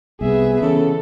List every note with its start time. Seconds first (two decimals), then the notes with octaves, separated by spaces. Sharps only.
0.21 C2 C3 B3 G#4 E5
0.62 C#3 E3 A4